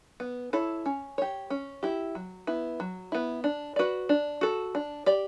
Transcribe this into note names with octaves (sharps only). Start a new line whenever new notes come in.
B3
E4 A4 C#5
C#4
G4 C#5
C#4
E4 G4
F#3
B3 E4
F#3
B3 E4
D4
F#4 B4 D5
D4
F#4 A4
D4
G4 D5